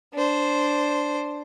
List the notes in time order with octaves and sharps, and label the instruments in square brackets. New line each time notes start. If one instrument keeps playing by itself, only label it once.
[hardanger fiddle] D4 C5